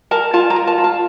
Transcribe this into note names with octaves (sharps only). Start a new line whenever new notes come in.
A#4 A5
F4 A5
A#5
A#4
A5
F4
A5